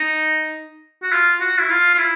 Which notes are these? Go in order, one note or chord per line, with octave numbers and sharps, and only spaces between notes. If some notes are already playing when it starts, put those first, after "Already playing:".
Already playing: D#4
F#4
F4
F#4
E4
F4
F4
E4